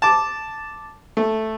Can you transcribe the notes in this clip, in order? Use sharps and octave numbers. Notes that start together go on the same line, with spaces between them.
A5 D6
A3